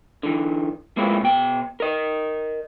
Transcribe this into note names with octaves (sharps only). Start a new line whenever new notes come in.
D3 E3
G#3 A#3 C4 E4 F4
B2 G5
A#4 D#5